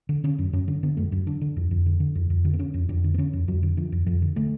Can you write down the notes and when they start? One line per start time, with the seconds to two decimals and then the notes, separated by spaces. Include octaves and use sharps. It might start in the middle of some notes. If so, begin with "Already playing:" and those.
0.09 D3
0.24 D3 C#4
0.39 F#2
0.53 F#2 C#4
0.68 D3
0.83 D3 B3
0.97 F#2 A3
1.12 F#2
1.27 D3 D4
1.41 D3
1.56 F2
1.71 F2
1.86 D3
2.00 D3
2.15 F2
2.30 F2
2.45 D3
2.54 B3
2.59 D3 C#4
2.74 F2
2.89 F2 D4
3.04 D3
3.14 B3
3.18 D3 C#4
3.33 F2
3.48 F2 F#3
3.63 D3
3.77 D3 F3
3.92 F2
4.06 F2 F3
4.22 D3
4.36 D3 A3